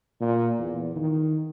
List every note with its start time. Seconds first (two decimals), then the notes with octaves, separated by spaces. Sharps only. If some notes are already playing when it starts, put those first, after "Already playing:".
0.20 A#2
0.59 E2
0.95 D#3